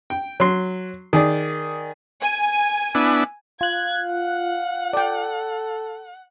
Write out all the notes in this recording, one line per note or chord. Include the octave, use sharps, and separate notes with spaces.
G5
F#3 C6
D#3 G#4 D5
G#5
B3 D4 E4
F4 F5 F#6 G#6
F#5
A4 D5 G5